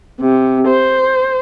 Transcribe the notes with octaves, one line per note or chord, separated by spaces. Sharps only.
C3
C5